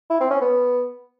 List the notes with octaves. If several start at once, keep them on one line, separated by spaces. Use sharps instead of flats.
E4
C4
C#4
B3